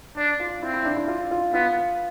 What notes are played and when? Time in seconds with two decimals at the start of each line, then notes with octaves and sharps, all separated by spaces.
0.17 D4 D5
0.40 F4
0.63 C4 E4
0.74 E4
0.85 D4
0.96 E4
1.08 F4
1.31 F4
1.54 B3 F4